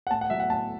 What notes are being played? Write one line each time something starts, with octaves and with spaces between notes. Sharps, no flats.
F#5
A2 A5
F#5
F#3 E5
F#5
A2 A5